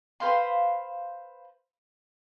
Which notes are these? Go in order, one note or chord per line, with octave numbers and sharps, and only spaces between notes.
B4 C5 F5 C6